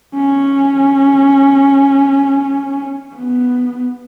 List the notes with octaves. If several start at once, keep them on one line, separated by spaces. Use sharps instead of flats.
C#4
B3